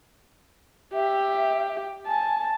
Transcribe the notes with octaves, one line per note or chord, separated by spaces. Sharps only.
G4 E5
G#5 A5